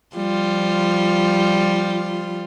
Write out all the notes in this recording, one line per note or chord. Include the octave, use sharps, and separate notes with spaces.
F3 G3 F4